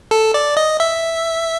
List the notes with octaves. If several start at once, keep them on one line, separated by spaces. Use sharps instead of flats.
A4
D5
D#5
E5